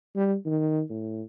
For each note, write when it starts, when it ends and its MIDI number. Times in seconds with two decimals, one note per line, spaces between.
0.16 0.36 55
0.46 0.83 51
0.90 1.22 45